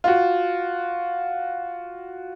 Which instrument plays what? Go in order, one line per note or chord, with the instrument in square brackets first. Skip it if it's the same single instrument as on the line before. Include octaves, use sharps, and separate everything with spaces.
[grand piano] F4 F#4